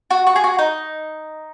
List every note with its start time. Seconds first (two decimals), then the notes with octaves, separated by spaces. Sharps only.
0.11 F#4
0.27 F#4
0.36 G#4
0.44 F#4
0.59 D#4